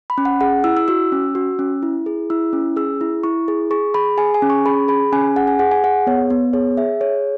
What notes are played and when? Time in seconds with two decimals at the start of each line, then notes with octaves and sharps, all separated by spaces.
0.10 B5
0.18 C#4
0.25 F#5
0.41 G#4 F#5
0.64 E4 E6
0.77 E6
0.88 F#4 E6
1.12 C#4
1.35 F#4
1.59 C#4
1.83 E4
2.06 G#4
2.30 E4 E6
2.53 C#4
2.76 G#4 E6
3.01 E4
3.23 E4 C#6
3.48 G#4
3.71 G#4 C#6
3.94 G#4 B5
4.18 G#4 G#5
4.34 G#5
4.42 C#4
4.50 C#6
4.66 G#4 B5
4.88 G#4 B5
5.13 C#4 G#5
5.36 G#4 F#5
5.48 G#5
5.59 G#4 F#5
5.72 G#5
5.84 G#4 F#5
6.07 B3 C#5
6.30 B3
6.53 G#4 C#5
6.77 G#4 E5
7.01 G#4 C#5